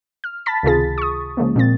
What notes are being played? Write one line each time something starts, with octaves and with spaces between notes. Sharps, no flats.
F6
A5 B5 A6 B6
C#2 C3 D#3 F4 G#4 A6
C#6 D#6
C#3 F3 G#3 A#3
A#2 C4 A6